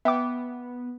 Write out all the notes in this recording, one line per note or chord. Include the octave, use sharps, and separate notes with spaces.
B3 E5 G5 D6